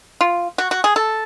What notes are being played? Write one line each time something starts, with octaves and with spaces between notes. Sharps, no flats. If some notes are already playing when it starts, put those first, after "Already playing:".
F4
F#4
F#4
G#4
A4